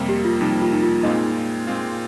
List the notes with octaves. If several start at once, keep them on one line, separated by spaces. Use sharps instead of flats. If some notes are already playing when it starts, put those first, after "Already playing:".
Already playing: F2 C3 G3 A#3
G4
F4
F2 C3 G3 A#3 D#4
F4
D#4
F4
A#2 G#3 C4 D#4 F4 D#5
A#2 G#3 C4 F4